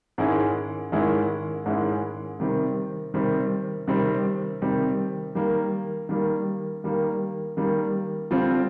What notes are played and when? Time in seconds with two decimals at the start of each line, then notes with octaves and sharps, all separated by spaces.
0.18 G#2 D#3 G#3 C#4 E4
0.92 G#2 D#3 G#3 C#4 E4
1.66 G#2 D#3 G#3 C#4 E4
2.40 C3 D#3 G3 C4
3.14 C3 D#3 G3 C4
3.87 C3 D#3 G3 C4
4.62 C3 D#3 G3 C4
5.35 D#3 G3 A#3
6.09 D#3 G3 A#3
6.84 D#3 G3 A#3
7.57 D#3 G3 A#3
8.31 D3 G3 C4 F4